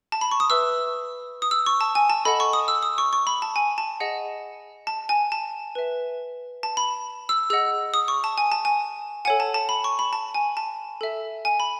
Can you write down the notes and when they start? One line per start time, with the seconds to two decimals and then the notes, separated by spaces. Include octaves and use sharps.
0.12 A5
0.21 B5
0.31 C#6
0.40 D#6
0.50 B4 E5 E6
1.42 D#6
1.51 E6
1.66 C#6
1.81 A5
1.95 G#5
2.10 A5
2.25 A4 D#5 F#5 B5
2.40 C#6
2.53 D#6
2.68 E6
2.83 D#6
2.98 C#6
3.13 C#6
3.27 B5
3.42 A5
3.56 G#5
3.78 A5
4.00 G#4 D#5 F#5
4.87 A5
5.09 G#5
5.32 A5
5.75 B4 E5
6.63 A5
6.77 B5
7.29 E6
7.50 G#4 D#5 F#5 E6
7.94 D#6
8.08 C#6
8.24 A5
8.38 G#5
8.52 A5
8.65 G#5
9.25 A4 C#5 F#5 G#5
9.40 A5
9.54 A5
9.69 B5
9.84 C#6
9.99 B5
10.13 A5
10.35 G#5
10.57 A5
11.01 A4 E5
11.45 G#5
11.60 B5